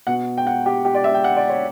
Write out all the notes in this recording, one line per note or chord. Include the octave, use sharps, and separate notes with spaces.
B2 F#5
G5
F#5
G4
G4
D5
E5
G5
F#5
D5
C#5